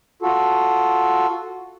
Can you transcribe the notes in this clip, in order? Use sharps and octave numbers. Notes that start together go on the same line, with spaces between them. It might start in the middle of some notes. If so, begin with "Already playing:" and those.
F4 F#4 A4